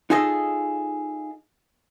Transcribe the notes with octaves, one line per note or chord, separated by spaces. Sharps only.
D#4 F4 G#4 A4 D#5